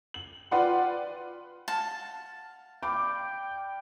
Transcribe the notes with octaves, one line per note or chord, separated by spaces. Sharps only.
F#7
F4 B4 D5 F#5 G5 C6
F5 F#5 A5
D5 F5 G5 B5 D6